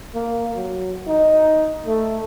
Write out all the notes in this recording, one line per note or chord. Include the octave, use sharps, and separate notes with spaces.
A#3
F#3
D#4
A3